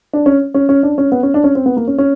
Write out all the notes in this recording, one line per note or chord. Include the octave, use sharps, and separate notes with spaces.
D4
C#4
C#4
C#4
D4
C#4
B3
C#4
D4
C#4
C4
B3
A#3
C#4
C#4